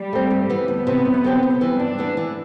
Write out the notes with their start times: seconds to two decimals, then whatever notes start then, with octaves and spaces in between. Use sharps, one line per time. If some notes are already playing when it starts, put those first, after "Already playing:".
Already playing: G3
0.13 A3 C4
0.31 G2
0.50 E3 B3
0.68 D2 B3
0.87 C3 E3
1.05 F#2
1.24 D3 F#3 C4 G4
1.43 C3
1.61 E3 G3
1.80 G2 D4
1.98 E3 B3
2.17 E3